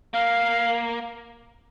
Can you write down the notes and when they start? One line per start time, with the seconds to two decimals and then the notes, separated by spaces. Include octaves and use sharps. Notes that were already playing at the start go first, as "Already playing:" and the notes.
0.14 A#3 F5